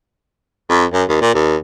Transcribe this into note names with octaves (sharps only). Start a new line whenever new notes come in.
F2
F#2
D#2
A#2
D#2